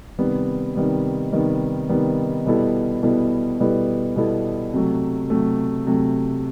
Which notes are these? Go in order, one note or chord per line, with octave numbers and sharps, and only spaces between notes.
C3 D#3 G3 B3
C3 D#3 G3 B3
C3 D#3 G3 B3
C3 D#3 G3 B3
B2 G3 B3 E4 A4
B2 G3 B3 E4 A4
B2 G3 B3 E4 A4
B2 G3 B3 E4 A4
C3 F#3 A3
C3 F#3 A3
C3 F#3 A3